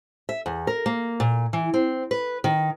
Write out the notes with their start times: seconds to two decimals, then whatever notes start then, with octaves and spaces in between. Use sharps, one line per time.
0.29 E5
0.46 E2
0.67 A#4
0.86 A#3
1.20 A#2
1.53 E3
1.74 C4
2.11 B4
2.44 D#3